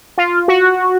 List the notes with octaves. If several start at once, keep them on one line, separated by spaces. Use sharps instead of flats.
F4
F#4